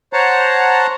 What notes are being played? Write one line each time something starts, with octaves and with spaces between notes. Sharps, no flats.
C5 C#5 F#5 A5 A#5